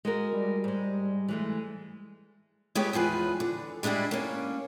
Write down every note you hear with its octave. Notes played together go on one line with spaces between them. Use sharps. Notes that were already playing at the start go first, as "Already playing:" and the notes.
G#3 F#4 A#4
G3
G#2 G#3
E3 G#3 A3
G#3 B3 G4 A4 B4 C#5
E2 F3 G#4 B4
D3
G3 G#3 D4 E4 G4
A#3 C#4